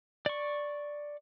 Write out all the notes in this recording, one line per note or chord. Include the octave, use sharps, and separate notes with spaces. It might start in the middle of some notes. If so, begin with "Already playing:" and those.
D5 C#6